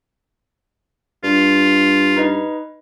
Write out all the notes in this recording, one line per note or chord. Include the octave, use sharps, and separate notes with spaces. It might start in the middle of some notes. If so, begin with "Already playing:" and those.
G2 F4
D#4 B4 D#5